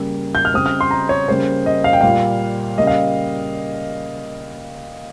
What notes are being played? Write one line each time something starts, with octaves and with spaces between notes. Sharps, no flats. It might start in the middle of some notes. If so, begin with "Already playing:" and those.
Already playing: C#3 G3 A#3
G6
F6
C#3 G3 C4 D#6
F6
C6
A#5
C#5
C#3 G3 A#3 C5
D#5
F5
G5
A#2 G3 A#3 F5
C#3 G3 A#3 D#5
F5